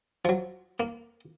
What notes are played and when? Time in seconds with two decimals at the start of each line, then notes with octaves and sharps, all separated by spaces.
0.25 F3 F#3
0.80 A#3